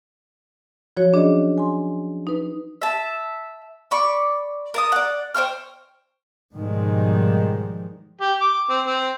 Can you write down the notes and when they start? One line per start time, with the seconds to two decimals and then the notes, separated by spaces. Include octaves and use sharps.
0.97 F3 F#3 F#4 C#5
1.13 C#4 D4 G#4 D5 D#5
1.58 G#5 C6
2.27 D#4 B4
2.82 E5 A5
3.91 D5 B5 C#6 D6
4.74 A#4 A5 D#6
4.92 D5 F#5
5.35 C5 G5 C#6 F6
6.53 G#2 B2 D#3 F3 G3 G#3
8.21 G4
8.41 D6
8.69 C4
8.87 C4